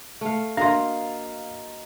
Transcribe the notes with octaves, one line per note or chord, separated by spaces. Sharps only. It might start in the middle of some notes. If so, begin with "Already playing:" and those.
A3 F5
A#3 D4 F#4 D#5 F5 A#5 C6